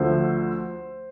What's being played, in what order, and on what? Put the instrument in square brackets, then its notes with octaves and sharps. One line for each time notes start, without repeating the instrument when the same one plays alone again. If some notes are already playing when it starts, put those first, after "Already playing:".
Already playing: [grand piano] D2 D3 F3 A3 C5